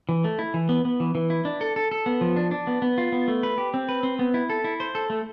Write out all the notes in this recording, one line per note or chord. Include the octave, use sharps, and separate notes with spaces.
E3
A3
E4
E3
B3
B3
E3
E3
E4
D4
A4
A4
A4
B3
F3
D4
D4
B3
B3
F4
B3
A3
B4
G4
C4
B4
C4
B3
E4
A4
E4
C5
A4
A3